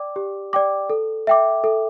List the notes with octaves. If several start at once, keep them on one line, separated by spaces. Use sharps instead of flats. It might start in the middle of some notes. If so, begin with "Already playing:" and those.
Already playing: D5 G5 D6
G4
D5 G5 D6
A4
E5 G5 D6
A4